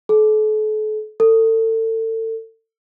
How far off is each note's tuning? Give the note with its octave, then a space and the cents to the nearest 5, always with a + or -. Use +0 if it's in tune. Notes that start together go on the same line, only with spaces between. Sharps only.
A4 -40
A4 +30